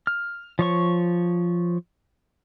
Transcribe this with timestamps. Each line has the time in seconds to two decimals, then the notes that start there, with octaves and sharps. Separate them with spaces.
0.07 F6
0.59 F3 C#5 C#6